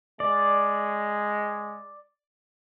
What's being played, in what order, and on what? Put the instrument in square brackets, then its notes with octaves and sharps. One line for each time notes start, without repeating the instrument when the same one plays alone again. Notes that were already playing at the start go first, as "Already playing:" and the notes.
[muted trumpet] G#3 [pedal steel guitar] D5